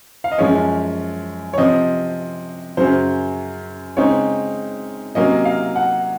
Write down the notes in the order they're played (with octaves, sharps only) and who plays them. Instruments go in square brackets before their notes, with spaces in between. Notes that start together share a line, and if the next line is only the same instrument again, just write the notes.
[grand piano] F5
D#5
F#2 F3 G#3 C#4 C#5
C#5
C3 F3 C4 D#5
F#2 C#3 F#3 C5
C#3 G#3 C4 D#4 C#5
C3 F#3 A#3 C#4 D#5
F5
F#5